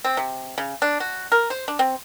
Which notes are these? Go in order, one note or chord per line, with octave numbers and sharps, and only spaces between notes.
C4
C3
C#3
D4
F#4
A#4
C5
D4
C4